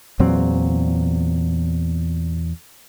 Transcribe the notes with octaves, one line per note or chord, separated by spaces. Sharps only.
E2 A#2 F#3 C4